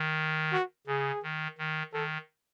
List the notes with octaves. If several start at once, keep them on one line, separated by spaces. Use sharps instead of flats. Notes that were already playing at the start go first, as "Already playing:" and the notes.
Already playing: D#3
F#4
C#3 G#4
D#3
D#3
D#3 A4